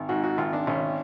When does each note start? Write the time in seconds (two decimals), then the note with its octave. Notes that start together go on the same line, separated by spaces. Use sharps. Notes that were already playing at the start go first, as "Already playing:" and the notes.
Already playing: G#1
0.09 G#2 F#4
0.24 F#4
0.38 G#1 F4
0.53 D4
0.67 G#1 C#4